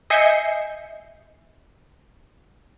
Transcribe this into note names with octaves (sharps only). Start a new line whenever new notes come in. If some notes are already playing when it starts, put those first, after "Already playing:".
D#5 E5 G#5 G6 C7 C#7